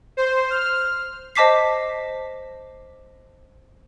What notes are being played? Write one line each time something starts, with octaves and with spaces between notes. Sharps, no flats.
C5
F6
C5 D#5 A5 D6 B6 C7